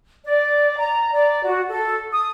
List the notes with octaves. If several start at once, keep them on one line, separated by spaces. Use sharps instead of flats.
D5
A#5
D5
F#4
A4
D#6